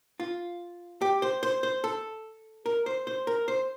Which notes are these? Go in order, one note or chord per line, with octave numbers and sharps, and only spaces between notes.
F4
G4
C5
C5
C5
A4
A#4
C5
C5
A#4
C5